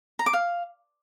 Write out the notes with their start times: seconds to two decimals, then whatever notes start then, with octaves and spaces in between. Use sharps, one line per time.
0.19 A#5
0.26 D6
0.33 F5